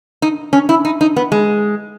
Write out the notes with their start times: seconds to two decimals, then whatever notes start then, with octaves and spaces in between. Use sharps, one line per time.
0.22 D#4
0.53 C#4
0.69 E4
0.85 D#4
1.01 D#4
1.16 B3
1.32 G#3